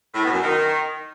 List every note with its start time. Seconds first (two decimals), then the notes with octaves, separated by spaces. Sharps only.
0.15 A2
0.24 B2
0.33 F#2
0.43 D#3